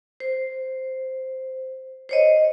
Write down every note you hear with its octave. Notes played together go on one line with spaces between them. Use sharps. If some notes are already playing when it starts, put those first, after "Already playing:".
C5
C5 C#5 D#5